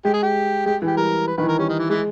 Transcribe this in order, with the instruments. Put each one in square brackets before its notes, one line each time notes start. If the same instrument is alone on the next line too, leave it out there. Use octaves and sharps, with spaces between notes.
[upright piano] G#3 [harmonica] G4
[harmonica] G#4
G4
[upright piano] G#3 [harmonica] G4
[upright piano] E3
[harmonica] G4
[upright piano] G3 [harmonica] A#4
[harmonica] B4
[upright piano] D#3 [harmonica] B4
[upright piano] E3
[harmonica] A#4
[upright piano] G3 [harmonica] C#4
[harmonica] D#3
E3
[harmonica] E3 [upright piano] G#3